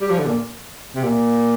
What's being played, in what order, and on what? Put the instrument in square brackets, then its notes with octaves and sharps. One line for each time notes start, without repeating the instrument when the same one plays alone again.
[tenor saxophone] G3
F3
D3
A#2
C3
A#2